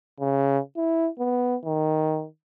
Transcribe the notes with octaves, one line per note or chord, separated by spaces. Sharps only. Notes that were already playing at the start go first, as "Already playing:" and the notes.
C#3
E4
B3
D#3